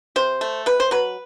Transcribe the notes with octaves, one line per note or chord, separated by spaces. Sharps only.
C3 C5
A3
C3 B4
C5
F#3 B4